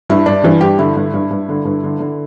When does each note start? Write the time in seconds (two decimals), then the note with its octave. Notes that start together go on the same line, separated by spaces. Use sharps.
0.09 G2 E4
0.26 G2 D4
0.44 G2 E3
0.61 G2 G4
0.79 D3 E4
0.97 G2
1.14 G2
1.31 G2
1.49 D3
1.65 G2
1.84 D3
2.00 D3